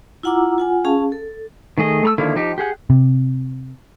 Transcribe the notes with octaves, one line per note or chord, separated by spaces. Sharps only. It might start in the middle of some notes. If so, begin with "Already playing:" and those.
E4 F4 F#5 A#5 D6 E6
F4 F#5 G#5
C#4 G#4 F5 A5
A4
D#3 A3 G#4 D#5
A3 A#5 E6
D3 D#3 F3 A#3 E4
F3 D#4 G4
G4 G#4 F#5
C3